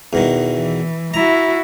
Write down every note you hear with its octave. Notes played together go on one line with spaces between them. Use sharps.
E2 B2 D#3
E3
E4 F#4 A#5